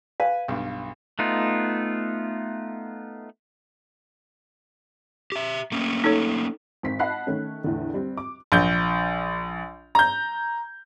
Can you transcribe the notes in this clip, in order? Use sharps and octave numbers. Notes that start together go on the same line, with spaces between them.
B4 F5 G#5
B1 G2
A3 B3 D#4 F4
G4 E5
A3 A#3 C#4
D#4 A4 C#5
G#1 C4 B6
D#5 F#5 A5 B5 F#6 C7
D#3 A3 C#4
E2 A2 D3
G3 C4
D6
A#1 G6
A#5 G6